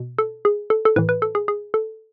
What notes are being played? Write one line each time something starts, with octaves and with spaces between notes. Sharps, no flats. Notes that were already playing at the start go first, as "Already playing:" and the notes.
Already playing: B2
A4
G#4
A4
A4
A2 E3 B4
B4
A4
G#4
G#4
A4